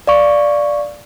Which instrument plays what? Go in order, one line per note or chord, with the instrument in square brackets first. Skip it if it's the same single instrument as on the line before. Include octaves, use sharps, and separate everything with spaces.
[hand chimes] D5 F5 C#6